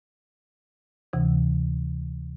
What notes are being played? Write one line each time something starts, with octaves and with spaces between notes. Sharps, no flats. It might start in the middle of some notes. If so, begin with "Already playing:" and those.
D2 C3 E3